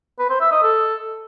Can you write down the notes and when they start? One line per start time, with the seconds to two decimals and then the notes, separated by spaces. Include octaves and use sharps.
0.19 B4
0.30 C5
0.41 E5
0.52 D#5
0.62 A4